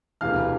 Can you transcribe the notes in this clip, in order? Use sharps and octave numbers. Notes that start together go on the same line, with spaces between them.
E1 D2 C3 E3 F5 F6